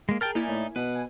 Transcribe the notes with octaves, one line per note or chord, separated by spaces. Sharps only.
G#3 A#3
G#4 A#4 G5 A5 F6
A#3 D#4 E4 D5 E5 G#5
A2
B2 B4
G#5